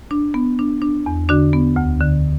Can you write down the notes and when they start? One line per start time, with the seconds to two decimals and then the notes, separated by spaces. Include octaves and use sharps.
0.11 D4
0.34 B3
0.59 D4
0.82 D4
1.06 E2
1.29 D3 D4 F#4
1.53 B3
1.76 D2
2.01 D3